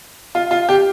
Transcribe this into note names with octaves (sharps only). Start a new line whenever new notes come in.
F4
F4
G4